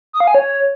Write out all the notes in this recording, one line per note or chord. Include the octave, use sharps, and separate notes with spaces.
D#6
F5
G#5
C#5